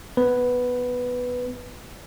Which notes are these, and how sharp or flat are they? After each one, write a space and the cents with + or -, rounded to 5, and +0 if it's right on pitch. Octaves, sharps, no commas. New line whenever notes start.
B3 +0 B4 +0